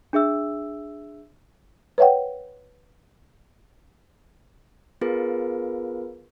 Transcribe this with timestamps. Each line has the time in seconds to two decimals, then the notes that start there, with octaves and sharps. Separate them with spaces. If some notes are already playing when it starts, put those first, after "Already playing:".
0.13 D4 G#4 E5 E6
1.98 B4 C#5 E5 F#5 G5
5.01 B3 F4 G#4 A#4 B4